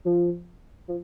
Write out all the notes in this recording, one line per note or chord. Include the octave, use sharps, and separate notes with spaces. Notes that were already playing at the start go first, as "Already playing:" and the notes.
F3
F3